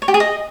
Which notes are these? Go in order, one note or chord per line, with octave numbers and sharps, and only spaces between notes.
C#5
G4
G#4
D#5